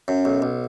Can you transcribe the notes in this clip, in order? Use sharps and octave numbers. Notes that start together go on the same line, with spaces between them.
F#2
B1
B1